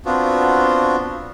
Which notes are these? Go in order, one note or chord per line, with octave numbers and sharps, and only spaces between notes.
B3 C4 D4 F4 F#4